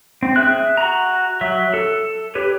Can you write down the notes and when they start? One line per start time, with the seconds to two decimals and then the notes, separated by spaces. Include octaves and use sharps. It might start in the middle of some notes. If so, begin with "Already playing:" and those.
0.23 C4
0.36 G#4 E5 F#6
0.77 F#4 A#5
1.41 F#3 E5
1.74 A4
2.35 G4 B4 C#5